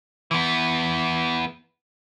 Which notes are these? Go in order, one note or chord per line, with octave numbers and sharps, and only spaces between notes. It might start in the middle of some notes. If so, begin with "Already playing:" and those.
E3 B3